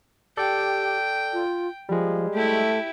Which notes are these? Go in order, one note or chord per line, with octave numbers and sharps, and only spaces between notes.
G4 A4 D5 G5
F4
F3 G3 G#3
A3 E4 G4